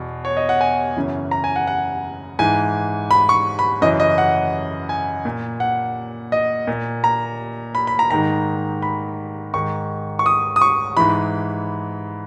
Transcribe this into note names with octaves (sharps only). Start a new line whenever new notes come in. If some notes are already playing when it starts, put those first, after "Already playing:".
Already playing: E2 B2
C#5
D#5
F#5
G#5
F#2 C#3 E3
A#5
G#5
F#5
F#5
G#2 E3 G#5
B5
C#6
B5
F#2 C#3 E3 D#5
D#5
F#5
G#5
A#2
F#5
D#5
A#2
A#5
B5
B5
A#5
G#2 D#3 A#5
B5
G#2 D#3 C#6
C#6
D#6
D#6
C#6
G#2 E3 B5